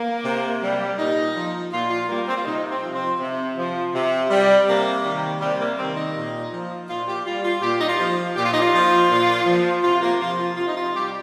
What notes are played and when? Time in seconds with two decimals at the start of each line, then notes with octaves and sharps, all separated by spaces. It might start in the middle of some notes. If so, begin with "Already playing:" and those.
Already playing: A#3
0.23 C3
0.61 G3
0.97 A#2 D#4
1.35 F3
1.71 A#2 F4
1.90 F4
2.08 G3 A#3
2.27 C4
2.37 F4
2.45 C3 D#4
2.71 C4
2.82 F3
2.94 C4
3.19 C3
3.56 F3
3.93 C3
4.30 G3
4.67 C3 A#3
5.04 D#3 G3
5.41 C3 G3
5.59 A#3
5.77 D#3 G3 C4
5.96 D#4
6.14 A#2
6.51 F3
6.88 A#2 F4
7.07 G4
7.25 G3 F4
7.44 F4
7.62 A#2 G4
7.81 D#4
7.87 F4
7.98 F3
8.35 A#2 G4
8.44 F4
8.52 D#4
8.61 F4
8.73 F3
9.10 A#2
9.46 F3
9.83 C3 F4
10.02 A#3
10.20 F3 F4
10.38 F4
10.57 C3 F4
10.67 D#4
10.76 F4
10.94 G3 G4